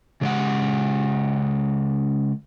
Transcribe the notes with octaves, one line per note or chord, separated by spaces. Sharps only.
C#3 G#3 F#5